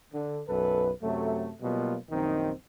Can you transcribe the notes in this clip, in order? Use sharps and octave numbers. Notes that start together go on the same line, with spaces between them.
D3
B1 F#2 A4 B4
F#2 C3 F#3 A3
B2 F#3 G3 A#3 B3 F4
A#1 F#2 D#3 C4 D#4